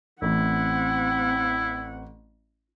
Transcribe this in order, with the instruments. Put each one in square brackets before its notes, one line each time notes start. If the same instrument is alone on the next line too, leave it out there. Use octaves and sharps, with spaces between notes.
[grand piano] A1 [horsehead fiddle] C4 F#5 [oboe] E4